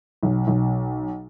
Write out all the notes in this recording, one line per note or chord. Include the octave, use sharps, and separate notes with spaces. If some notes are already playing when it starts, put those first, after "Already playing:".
B1
B1